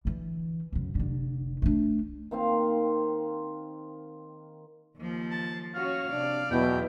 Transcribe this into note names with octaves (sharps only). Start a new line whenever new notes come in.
D3 E3
F#2 C#3
F1 D3
A3 D4
D#3 A#3 C4 F5
D#2 F3
A5
C#4 F#4 C#5 F5
C3 D4 D5
E2 B2 F#3 E4 G5